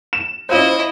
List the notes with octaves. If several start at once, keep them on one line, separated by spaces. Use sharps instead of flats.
E7
C#4 E4 F4 C5 D#5